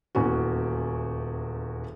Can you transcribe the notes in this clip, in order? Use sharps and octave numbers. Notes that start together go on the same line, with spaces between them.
D#1 E2 C#4 F#4